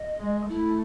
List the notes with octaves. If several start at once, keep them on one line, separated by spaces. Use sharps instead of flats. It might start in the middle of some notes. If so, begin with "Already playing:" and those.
Already playing: D#5
G#3
A3 E4